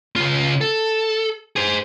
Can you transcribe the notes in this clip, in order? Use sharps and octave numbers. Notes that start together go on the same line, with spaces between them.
C#3 F4
A4
G#4 C5